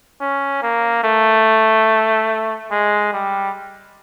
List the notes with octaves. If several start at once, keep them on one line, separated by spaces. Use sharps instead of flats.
C#4
A#3
A3
G#3
G3